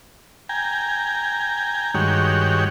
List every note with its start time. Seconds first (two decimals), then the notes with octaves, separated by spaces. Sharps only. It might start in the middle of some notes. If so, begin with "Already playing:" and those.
0.49 G5 G#5 A#5
1.94 G2 D#3 G#3 F#4 C#5 G5